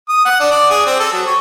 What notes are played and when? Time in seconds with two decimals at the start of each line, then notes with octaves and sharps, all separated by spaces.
0.09 D#6
0.25 F#5
0.40 D4
0.51 D5
0.70 G#4
0.86 C4
0.99 A4
1.13 F#3
1.27 C#5